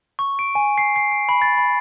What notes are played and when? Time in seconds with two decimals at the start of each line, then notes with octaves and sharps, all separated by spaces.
0.19 C#6
0.39 D7
0.55 G#5
0.78 C7
0.96 C7
1.12 D7
1.29 B5
1.42 A6
1.57 B5